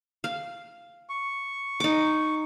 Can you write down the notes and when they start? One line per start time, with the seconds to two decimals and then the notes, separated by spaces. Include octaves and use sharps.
0.24 F5
1.09 C#6
1.80 D#4 D6